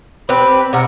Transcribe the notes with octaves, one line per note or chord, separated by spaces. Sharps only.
C4 G4 B4 B5
C3 A#4 F#5